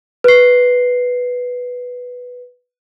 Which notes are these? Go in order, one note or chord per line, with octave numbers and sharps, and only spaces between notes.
B4 C7